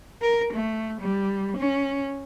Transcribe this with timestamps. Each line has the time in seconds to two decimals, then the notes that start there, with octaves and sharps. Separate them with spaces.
0.22 A#4
0.53 A3
1.01 G3
1.57 C#4